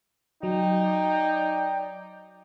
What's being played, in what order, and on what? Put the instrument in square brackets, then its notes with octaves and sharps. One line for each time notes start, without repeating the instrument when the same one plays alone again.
[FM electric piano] F#3 [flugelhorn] D#4 [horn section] D5 G5